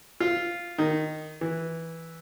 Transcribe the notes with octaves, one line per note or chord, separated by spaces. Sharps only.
F4
D#3
E3